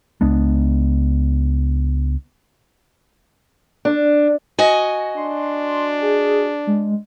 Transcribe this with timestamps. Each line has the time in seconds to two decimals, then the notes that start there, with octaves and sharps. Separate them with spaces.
0.21 C#2 G#3 B3 D4
3.85 D4
4.59 F#4 D#5 G#5
5.17 D4 C6
6.01 G#4
6.67 G#3